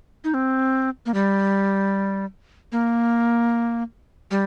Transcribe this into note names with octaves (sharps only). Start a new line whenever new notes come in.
D#4
C4
A#3
G3
A#3
G3